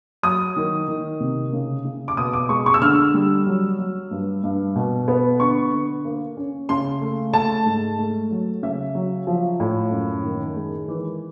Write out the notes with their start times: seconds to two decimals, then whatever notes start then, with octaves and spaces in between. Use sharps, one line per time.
0.23 F#3 D#6
0.57 D#3
0.88 D#3
1.20 C3
1.53 C#3
1.85 C#3
2.08 D6
2.17 B2 D#6
2.33 D6
2.49 G#3 C#6
2.66 C#6
2.74 E6
2.82 D3 F6
3.14 G3
3.47 F#3
3.79 F#3
4.11 G2
4.44 G2
4.76 B2
5.08 B3
5.40 D3 C#6
5.72 D3
6.05 A#3
6.37 C#4
6.69 C#3 C6
7.01 A3
7.33 A3 A5
7.66 G#2
7.98 A3
8.31 F#3
8.63 C#3 E5
8.95 F#3
9.27 F3
9.60 A2
9.92 F#2
10.24 D#3
10.56 G#3
10.88 E3